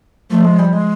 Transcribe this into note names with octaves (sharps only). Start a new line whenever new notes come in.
F3 A3
G#3
G3
G#3